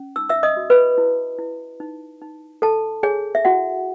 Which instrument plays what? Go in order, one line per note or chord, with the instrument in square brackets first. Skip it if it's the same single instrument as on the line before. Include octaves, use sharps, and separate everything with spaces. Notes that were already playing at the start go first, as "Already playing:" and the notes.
Already playing: [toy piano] C#4
D#4 E6
E5 E6
D#5 D#6
F#4
B4 B5
E4
E4
D#4
D#4
A4 A5
G#4 C#5 G#5
E5
E4 F#4 F#5